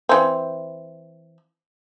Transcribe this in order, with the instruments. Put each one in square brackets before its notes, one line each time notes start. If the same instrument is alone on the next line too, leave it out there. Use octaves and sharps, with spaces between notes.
[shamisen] E3 C4